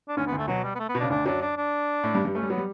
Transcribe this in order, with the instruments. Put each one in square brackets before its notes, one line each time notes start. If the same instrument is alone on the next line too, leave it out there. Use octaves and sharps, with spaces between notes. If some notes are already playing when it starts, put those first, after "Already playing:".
[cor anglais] D4
[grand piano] D2 D3 [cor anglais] C#4
[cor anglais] B3
[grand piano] D2 D3
[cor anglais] A3
[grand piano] B2 [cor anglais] F#3
[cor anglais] G3
B3
A3
B3
[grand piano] B2
[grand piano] C#3 [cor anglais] D4
[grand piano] D2 D3 [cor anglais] D4
[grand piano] F#2 F#3 [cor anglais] D4
[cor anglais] D4
D4
[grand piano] A2 A3
G2 G3
G2 G3
[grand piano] A3 [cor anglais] C#4
[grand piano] G3
[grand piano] F#3 [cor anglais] B3
[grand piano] G3